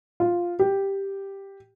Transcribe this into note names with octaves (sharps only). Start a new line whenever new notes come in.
F4
G4